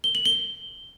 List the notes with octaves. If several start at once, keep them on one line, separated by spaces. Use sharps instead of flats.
G7
F#7
G7